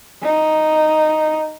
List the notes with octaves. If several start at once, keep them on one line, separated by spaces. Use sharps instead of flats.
D#4